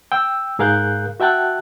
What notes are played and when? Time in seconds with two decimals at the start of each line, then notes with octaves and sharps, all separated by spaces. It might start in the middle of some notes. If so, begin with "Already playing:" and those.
0.12 G5 E6
0.59 G#2 G#4 A#4 F5 F#6 G6
1.20 F#4 E5 G5 A5 F#6